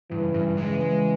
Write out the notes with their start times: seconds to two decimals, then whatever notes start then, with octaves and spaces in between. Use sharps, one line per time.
0.10 G2 C#3 E3
0.34 G2
0.57 C#3 E3 G#3
0.80 G#3